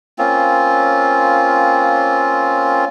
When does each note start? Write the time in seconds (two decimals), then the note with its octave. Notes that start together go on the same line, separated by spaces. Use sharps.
0.18 A#3 C4 C#4 F4